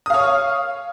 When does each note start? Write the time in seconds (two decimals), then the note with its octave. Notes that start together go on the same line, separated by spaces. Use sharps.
0.06 D#6
0.10 F5
0.14 C#5